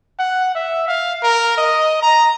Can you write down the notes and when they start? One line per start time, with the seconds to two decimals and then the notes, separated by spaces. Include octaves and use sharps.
0.19 F#5
0.55 E5
0.88 F5
1.23 A#4
1.57 D#5
2.02 A#5